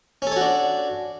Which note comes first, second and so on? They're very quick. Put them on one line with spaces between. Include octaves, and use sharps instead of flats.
C#4 A4 C#5 F#4 D4